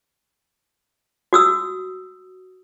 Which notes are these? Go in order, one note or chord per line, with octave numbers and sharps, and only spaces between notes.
F#4 D#6 E6